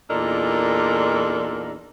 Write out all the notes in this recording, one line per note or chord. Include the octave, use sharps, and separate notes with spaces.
E2 A#2 D4 D#4 A4 A#4